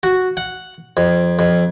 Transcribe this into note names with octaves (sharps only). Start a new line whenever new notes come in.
F#4
F#5
F2
F2